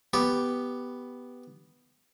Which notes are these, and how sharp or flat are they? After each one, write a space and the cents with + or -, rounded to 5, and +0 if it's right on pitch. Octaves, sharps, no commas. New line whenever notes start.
B3 +0 G4 +0